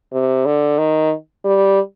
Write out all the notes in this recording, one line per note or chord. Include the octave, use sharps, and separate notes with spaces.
C3
D3
D#3
G3